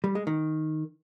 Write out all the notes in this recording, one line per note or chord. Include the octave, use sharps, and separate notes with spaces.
G3
G#3
D#3